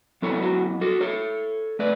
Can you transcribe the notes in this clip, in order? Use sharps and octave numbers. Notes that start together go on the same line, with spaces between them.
F#3 B3 E4 A4 C#5
F#4
F#4 A4
A4 C#5
A3 B4 D5